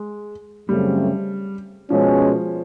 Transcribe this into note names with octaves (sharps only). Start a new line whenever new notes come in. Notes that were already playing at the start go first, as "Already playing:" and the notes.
Already playing: G#3
F#2 C#3 F#3 G3 A3 C4
B2 F3 G#3 C#4